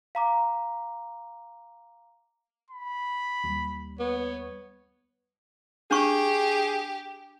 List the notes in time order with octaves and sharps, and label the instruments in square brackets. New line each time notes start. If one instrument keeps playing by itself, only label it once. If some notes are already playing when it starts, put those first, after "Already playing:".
[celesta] F5 A#5 D6
[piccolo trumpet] B5
[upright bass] D#2 G3
[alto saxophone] B3 [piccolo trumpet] C#5
[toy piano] D4 C#6 [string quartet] G4 [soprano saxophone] G#4